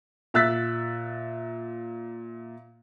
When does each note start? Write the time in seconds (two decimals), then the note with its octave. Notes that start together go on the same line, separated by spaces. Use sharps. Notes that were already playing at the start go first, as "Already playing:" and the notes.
0.34 A#2 E5 E6 F#6 A6 B6